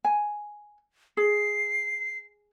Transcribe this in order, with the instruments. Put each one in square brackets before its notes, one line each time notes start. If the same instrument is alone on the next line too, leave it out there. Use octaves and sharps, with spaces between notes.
[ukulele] G#5
[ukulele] G#4 [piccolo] C7